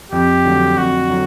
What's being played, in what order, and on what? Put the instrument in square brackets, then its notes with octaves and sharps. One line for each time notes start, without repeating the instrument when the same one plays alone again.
[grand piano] F2 [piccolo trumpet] G4
[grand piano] D3 F#3 A3
[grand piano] F2 [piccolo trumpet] F#4
[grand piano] D3 F#3